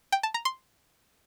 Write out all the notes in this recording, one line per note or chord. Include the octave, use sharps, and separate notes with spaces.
G5
A5
A#5
C6